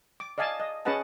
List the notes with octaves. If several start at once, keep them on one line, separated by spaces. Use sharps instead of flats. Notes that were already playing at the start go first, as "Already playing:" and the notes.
D6
D5 D#5 F5 G#5 A5
D#5
C#4 G#4 B4 D#5 F#5 A5